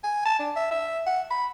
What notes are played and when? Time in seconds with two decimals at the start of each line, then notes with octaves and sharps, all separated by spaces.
0.04 G#5
0.26 A5
0.39 D4
0.56 E5
0.71 E5
1.06 F#5
1.31 B5